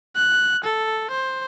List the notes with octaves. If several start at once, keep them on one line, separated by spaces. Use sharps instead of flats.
F#6
A4
C5